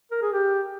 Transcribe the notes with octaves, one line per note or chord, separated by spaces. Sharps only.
A#4
G#4
G4